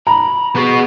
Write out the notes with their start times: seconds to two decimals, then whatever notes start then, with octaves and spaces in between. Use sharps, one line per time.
0.07 A#5 B5
0.56 B3 F#4 G#4